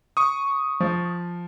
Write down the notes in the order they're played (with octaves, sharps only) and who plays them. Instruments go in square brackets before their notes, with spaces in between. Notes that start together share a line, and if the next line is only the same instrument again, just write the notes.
[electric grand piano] C#6 D#6
[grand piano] F3